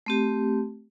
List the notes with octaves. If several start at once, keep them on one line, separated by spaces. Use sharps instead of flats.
A3 C4 G4